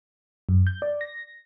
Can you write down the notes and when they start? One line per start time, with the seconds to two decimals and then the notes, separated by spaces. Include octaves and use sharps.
0.49 F#2
0.67 G6
0.82 D5
1.01 A#6